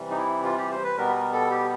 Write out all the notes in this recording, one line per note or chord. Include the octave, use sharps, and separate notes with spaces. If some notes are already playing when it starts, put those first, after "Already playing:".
Already playing: C3 E3 G3
D#4
E4
F4
G4
C5
B4
B2 G3 B3 A#4
A#4
A4
G4